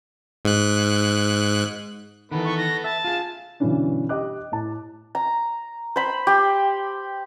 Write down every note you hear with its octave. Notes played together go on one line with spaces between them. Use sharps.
G#2 F#6
D#3 E3 B3 A4 B4
C#6
A#6
E5 A5
F4 G#4 F5
G2 B2 D3 E3 C#4 D4
G4 D#5 D6 F#6
A2 A5
A#5
C5 B5
G4